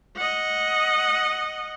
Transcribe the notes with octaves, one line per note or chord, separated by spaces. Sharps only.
D#5 F#5